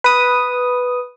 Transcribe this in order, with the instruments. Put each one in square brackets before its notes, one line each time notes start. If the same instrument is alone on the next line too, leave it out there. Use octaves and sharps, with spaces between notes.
[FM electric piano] B4 D#6